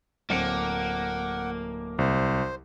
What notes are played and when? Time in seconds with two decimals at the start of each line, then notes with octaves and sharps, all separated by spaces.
0.30 D1 A#3 C4 F#5 C#7
1.99 C2 C5